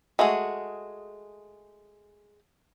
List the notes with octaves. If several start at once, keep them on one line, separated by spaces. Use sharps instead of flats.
G#3 A3 F#4 G#4